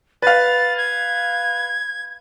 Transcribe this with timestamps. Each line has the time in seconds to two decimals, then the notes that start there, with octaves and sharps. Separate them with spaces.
0.22 B4 F5 A6
0.78 G#6